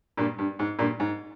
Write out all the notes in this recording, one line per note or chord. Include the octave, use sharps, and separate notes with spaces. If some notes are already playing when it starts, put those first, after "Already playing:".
G2 A#2
G2
G#2
G2 A#2
G#2